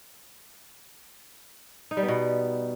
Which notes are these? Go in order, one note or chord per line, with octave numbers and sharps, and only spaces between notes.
D#4
G3
B3
B2